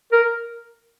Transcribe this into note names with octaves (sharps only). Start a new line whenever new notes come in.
A#4